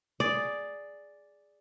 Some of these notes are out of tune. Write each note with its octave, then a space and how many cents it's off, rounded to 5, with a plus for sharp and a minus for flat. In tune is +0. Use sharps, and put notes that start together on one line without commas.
G#4 +0 D5 +0